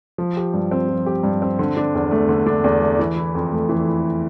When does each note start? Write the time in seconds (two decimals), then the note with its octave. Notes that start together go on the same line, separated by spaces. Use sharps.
0.18 F3
0.37 G4
0.54 G2
0.71 C4
0.89 F3
1.06 G4
1.23 G2
1.42 C4
1.59 D3
1.77 D4
1.95 E2
2.11 A3
2.29 D3
2.47 D4
2.64 E2
2.82 A3
2.99 E3
3.17 E4
3.35 F2
3.52 A3
3.69 E3
3.87 E4